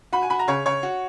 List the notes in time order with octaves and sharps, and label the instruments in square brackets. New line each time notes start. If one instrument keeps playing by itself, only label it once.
[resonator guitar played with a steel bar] F#4 [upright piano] B5
[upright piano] G#5
[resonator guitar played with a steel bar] F#4 [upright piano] B5
[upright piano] A#5
[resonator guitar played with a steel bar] C#3 [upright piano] C#5
[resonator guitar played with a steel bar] C#3 [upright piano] C#5
[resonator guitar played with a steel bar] F#4